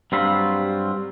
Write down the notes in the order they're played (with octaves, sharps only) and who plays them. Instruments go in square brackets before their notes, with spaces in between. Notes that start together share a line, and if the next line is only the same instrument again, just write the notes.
[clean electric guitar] G2 F#3 C4 F4 B5